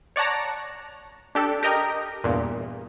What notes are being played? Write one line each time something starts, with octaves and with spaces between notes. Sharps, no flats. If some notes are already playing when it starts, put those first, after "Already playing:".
C#5 D5 F#5 A5 A#5
D4 G4 A4
G4 A#4 D#5 G5 A#5
E2 G2 A#2